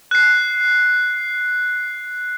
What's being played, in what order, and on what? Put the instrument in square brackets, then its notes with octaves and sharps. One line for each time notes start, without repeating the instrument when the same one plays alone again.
[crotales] F#6 C7